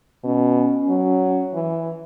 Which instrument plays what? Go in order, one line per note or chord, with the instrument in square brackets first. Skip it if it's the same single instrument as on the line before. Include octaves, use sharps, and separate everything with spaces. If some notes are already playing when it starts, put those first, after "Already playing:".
[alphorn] B2 [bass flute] C#4
[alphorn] F#3
E3